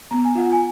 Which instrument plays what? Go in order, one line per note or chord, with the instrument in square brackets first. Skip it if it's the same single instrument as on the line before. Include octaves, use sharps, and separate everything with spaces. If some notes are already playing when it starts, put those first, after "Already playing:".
[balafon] B3 [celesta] A#5
[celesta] G#5
[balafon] F4 [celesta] F#5
[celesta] G#5